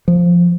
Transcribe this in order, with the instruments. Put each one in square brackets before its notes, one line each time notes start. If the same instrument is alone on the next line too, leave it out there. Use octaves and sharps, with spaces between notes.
[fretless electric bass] F3